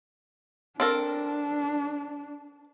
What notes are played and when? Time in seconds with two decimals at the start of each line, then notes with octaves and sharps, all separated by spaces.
0.80 C4 D4 A4 A#4